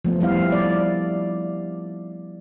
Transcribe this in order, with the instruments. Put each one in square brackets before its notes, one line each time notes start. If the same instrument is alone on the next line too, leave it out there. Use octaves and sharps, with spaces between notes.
[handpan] F3 A3 B3
F3 G3 E4 F5
D5